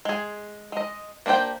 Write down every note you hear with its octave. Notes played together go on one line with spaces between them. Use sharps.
G#3 G#4
G#3 D#5
A#3 D4 G4 C5 G5